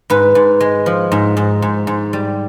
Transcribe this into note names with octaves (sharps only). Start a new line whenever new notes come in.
G#2 B4
G#2
G#3
F3
G#2
G#2
G#2
G#2
G3